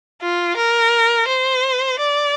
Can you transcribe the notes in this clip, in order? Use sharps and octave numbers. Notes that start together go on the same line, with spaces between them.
F4
A#4
C5
D5